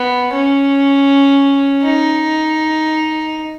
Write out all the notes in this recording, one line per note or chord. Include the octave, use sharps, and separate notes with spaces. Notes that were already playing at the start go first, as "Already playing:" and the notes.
Already playing: B3
C#4
D#4